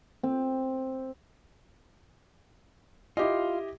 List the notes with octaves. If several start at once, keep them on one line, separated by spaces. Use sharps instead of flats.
C4
E4 F4 G4 D#5